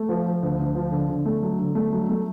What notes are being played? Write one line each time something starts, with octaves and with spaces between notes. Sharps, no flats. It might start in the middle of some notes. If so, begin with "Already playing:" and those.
Already playing: A3
F3
F3
D2
D2
F3
D3
D3
A3
F#3
D3
A3
F#3
A3